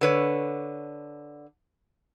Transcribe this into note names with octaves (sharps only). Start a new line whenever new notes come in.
D3 B4 C#5